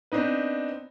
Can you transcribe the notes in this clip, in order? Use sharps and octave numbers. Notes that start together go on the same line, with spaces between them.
B3 C4 D4 D#4 B4